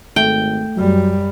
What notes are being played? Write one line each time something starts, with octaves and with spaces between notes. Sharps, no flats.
G#1 A3 G5
F#2 F#3 G3